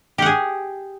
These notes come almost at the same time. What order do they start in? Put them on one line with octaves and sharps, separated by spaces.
G4 F#5 G#4